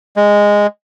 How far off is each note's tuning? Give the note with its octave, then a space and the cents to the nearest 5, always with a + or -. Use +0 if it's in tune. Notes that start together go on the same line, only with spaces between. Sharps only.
G#3 -10